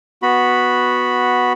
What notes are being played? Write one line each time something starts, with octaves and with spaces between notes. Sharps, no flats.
B3 F#4 B5